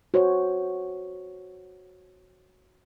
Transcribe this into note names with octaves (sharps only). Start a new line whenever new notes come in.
F#4 C5 C#5